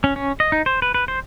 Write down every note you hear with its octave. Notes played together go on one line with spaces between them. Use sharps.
C#4
C#4
D#5
D#4
C5
B4
B4
C5